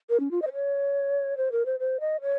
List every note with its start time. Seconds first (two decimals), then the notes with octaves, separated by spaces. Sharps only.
0.10 A#4
0.20 C#4
0.31 F4
0.42 D#5
0.47 C5
0.53 C#5
1.37 C5
1.52 A#4
1.66 C5
1.79 C5
2.00 D#5
2.21 C#5